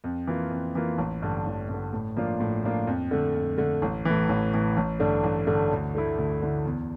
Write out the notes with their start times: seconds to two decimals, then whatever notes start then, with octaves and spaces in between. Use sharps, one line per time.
0.04 F2
0.27 E3 A#3 F4
0.50 F2
0.75 E3 A#3 F4
0.98 A1
1.22 G2 D3
1.46 A1
1.69 G2 D3
1.93 A2
2.17 F3 A#3 D4 F4
2.40 A2
2.63 F3 A#3 D4 F4
2.87 F2
3.11 D3 A3
3.34 F2
3.58 D3 A3
3.82 A1
4.05 A2 E3
4.29 A1
4.53 A2 E3
4.77 A1
5.00 G2 D3 A3 D4
5.24 A1
5.47 G2 D3 A3 D4
5.72 D2
5.95 D3 A3 E4
6.18 D2
6.42 D3 A3 E4
6.65 E2